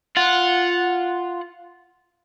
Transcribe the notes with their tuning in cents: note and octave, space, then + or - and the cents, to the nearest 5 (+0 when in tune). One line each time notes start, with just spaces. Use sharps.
F4 +0 F#5 -10